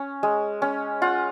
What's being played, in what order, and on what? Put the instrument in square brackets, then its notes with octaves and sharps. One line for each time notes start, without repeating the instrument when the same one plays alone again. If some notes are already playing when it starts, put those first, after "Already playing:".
Already playing: [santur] C#4
G#3
C#4
F4 F#5